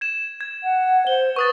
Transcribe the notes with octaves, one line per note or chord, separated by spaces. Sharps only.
G#6 E7
G#6
F#5
C5 G7
B4 C#6 D#6 A6